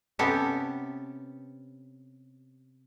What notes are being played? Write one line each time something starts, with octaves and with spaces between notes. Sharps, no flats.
C3 B3 C#4 G4 A4